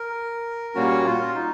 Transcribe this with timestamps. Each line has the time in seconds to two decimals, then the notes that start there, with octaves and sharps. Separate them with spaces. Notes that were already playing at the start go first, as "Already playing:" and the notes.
Already playing: A#4
0.75 A#2 G3 A#3 C#4 F#4
1.05 F4
1.35 D#4